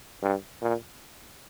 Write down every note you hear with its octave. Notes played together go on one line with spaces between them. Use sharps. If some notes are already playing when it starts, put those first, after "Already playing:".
G2
A#2